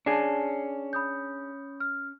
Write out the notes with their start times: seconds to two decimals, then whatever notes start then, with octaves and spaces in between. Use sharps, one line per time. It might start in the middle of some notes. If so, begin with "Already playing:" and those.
0.06 C#4 D4 G#4 A5 C7
0.93 B5 D#6 G6
1.80 F6